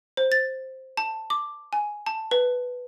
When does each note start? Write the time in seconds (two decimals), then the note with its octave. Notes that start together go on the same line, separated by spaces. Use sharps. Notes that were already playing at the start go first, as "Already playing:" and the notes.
0.17 C5
0.32 A6
0.97 A5
1.30 D6
1.73 G#5
2.06 A5
2.31 B4